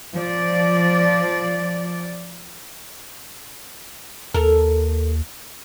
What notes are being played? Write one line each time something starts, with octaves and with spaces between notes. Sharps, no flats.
F3 D5
D#2 A4 A#4